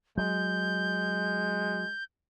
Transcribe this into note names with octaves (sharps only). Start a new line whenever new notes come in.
F#3 G#3 G6